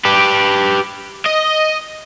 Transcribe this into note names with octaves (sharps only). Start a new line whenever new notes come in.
G4 B4
D#5